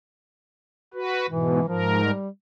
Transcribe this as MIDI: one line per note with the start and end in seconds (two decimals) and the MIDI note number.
0.94 1.26 66
0.94 1.26 71
1.29 1.60 44
1.29 1.60 47
1.29 1.68 52
1.68 2.11 44
1.68 1.99 53
1.68 2.11 70
2.04 2.29 55